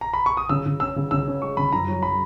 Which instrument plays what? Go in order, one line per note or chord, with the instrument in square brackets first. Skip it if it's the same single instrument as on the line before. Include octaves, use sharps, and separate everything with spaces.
[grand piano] A#5
B5
C#6
D#6
[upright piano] C#3 [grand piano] E6
[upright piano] C#3
[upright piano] C#4 [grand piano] E6
[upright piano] C#3
[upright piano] C#3 [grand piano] E6
[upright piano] C#4
[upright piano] G#3 [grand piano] C#6
[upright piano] C#3 [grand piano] B5
[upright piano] F#2 [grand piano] A#5
[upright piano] F#3
[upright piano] F#3 [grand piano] B5